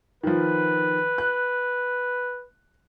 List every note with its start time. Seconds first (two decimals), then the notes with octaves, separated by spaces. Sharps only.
0.23 D#3 F3 B4
1.18 F#6